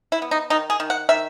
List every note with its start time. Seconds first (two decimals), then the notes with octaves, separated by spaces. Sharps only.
0.12 E4
0.22 B3
0.31 D#4
0.50 D#3 D#4
0.70 G#4
0.80 D#3
0.90 F#5
1.09 D#3 E5